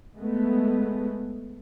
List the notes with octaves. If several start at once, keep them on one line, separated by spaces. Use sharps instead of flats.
G#3 A3 B3